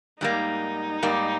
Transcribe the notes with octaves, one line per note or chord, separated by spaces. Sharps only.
G#2 G3 A#3 D#4
G#2 G3 A#3